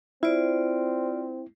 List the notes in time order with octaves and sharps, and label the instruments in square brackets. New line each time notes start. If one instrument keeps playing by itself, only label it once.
[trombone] C4 [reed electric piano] E4 [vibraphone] F4 C5 D5